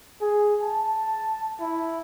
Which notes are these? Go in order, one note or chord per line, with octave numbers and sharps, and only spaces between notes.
G#4
A5
E4